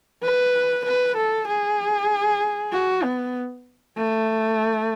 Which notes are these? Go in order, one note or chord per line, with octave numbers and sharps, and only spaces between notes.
B4
B4
A4
G#4
F#4
B3
A3